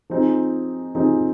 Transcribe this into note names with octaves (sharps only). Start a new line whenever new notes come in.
F3 C4 D#4 G#4
F3 C4 D#4 G#4